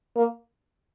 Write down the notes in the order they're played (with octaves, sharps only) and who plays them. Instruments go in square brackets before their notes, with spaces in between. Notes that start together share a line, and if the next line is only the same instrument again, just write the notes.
[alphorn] A#3